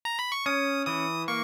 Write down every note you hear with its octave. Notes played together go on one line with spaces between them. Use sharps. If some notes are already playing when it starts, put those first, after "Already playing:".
A#5
B5
C#6
C#4 D#6
E3 D#6
A#3 C#6